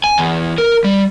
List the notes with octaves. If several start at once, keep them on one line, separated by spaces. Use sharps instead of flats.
G#5
E2
A#4
G3